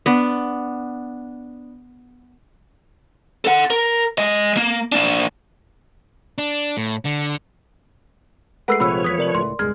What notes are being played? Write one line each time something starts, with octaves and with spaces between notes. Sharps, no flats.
B3 D4
A4 F#5
A#4
G#3 D#5
A#3
A#3 D4
D4
A2
D3
G#3 A3 A#4 B4 F#5 E6 C7
A#1 C3 F3 C#5 B5 E6
E2 D#6 B6
C3 A#4 D5 F#7
D1 C#2 A2 C6
E1 C#2 G2 G#3 F6 G#6